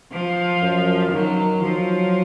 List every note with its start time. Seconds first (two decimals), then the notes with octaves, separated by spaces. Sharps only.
0.12 F3
0.62 F#2
1.12 D#3 F#3
1.62 F3 F#3